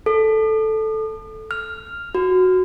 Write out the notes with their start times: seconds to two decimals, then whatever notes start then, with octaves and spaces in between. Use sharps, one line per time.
0.06 A4
1.51 F6
2.15 F#4